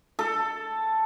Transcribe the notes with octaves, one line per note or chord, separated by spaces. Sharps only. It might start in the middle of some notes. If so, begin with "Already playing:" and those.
A4